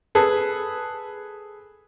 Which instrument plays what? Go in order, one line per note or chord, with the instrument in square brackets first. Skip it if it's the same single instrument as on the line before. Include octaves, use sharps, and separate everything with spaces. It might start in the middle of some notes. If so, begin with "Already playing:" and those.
[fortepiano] G#4 A4 B4